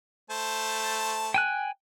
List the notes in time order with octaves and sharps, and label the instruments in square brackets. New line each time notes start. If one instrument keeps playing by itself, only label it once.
[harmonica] A3 C5 A5
[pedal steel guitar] G5 G#5 F#6